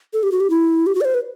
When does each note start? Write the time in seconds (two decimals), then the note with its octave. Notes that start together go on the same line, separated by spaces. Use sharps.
0.13 A4
0.23 G4
0.32 F#4
0.40 G4
0.50 E4
0.87 G4
0.95 F#4
1.01 D5
1.05 C5
1.14 B4